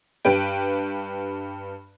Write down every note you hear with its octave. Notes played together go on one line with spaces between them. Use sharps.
G2 G4 B4 G5